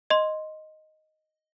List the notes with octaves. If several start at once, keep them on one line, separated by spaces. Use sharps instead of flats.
D#5 C6